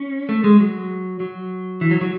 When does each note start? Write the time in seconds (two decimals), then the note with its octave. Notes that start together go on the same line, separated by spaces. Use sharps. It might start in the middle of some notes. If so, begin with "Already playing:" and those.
Already playing: C#4
0.29 A3
0.44 G#3
0.60 F#3
1.20 F#3
1.81 E3
1.91 F#3
2.01 F#3